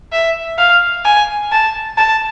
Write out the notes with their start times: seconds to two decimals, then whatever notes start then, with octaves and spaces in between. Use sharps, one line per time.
0.12 E5
0.58 F5
1.05 G#5
1.52 A5
1.97 A5